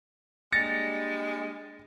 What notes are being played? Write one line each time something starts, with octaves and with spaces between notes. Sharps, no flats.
G3 G#3 A#3 D4 A6 A#6 C#7